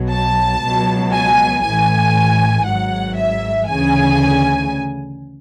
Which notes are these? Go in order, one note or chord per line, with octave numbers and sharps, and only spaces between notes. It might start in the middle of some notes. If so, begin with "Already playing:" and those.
Already playing: B1 B2 F#3
A5
C#2 B2 F#3
G#5
A1 A2 E3 G#5
G#1 G#2 F#3 F#5
E5
D2 C#3 E3 G#5